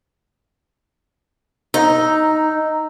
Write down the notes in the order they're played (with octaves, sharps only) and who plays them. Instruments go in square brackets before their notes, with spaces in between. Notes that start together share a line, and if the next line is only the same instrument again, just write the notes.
[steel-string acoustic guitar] D#4 [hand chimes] A#5 E6